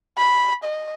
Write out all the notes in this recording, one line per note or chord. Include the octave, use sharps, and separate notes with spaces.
B5
D#5